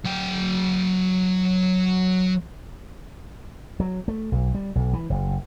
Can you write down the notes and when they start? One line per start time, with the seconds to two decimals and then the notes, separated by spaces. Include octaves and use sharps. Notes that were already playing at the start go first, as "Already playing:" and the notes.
0.05 F#3 G5
3.80 F#3
4.08 A3
4.32 B1
4.55 G3
4.75 B1
4.93 E3
5.10 F#1